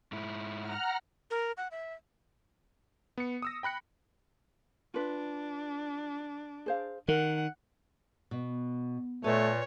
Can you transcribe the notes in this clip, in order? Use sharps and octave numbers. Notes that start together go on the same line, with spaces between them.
G#2 E4
F#5 A#5 F6
A#4
F#5
E5
B3 C#7
D#6 E6 A#6
G5 B5 F#6 C#7
D4 F4 B4
G#4 C5 F5
D#3 A#4 F#5
B2
A#2 A3 B4 C#5 D#5 A5